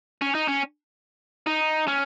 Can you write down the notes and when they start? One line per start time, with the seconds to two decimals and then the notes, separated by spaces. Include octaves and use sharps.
0.22 C#4
0.35 D#4
0.48 C#4
1.46 D#4
1.88 C#4